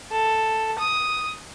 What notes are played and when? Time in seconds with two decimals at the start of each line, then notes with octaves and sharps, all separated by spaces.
0.11 A4
0.79 D#6